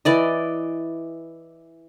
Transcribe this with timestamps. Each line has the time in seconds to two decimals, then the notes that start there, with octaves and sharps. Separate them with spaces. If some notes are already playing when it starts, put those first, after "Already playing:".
0.05 E3 D5 D#5